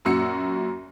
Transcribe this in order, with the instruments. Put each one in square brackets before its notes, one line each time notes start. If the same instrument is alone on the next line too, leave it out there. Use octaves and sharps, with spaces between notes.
[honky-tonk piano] F#2 A#2 F#4 E6 C#7